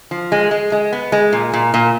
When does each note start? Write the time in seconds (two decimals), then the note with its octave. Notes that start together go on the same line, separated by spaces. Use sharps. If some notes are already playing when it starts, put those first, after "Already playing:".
0.11 F3
0.32 G#3
0.51 G#3
0.72 G#3
0.93 B3
1.12 G#3
1.33 A#2
1.53 A#2
1.74 A#2